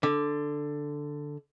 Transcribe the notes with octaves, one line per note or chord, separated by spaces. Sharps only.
D3